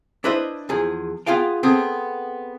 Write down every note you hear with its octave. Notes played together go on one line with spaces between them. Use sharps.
D4 E4 B4 C5 D#5 E5
E2 F3 G#4
B3 F4 G#4 F5 G5
B3 C4 G#4 A4